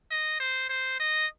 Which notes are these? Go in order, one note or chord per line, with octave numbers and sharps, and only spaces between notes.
D#5
C5
C5
D#5